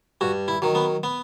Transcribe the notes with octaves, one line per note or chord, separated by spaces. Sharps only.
G2 F#4
E4
D#3 F#3
B3
B3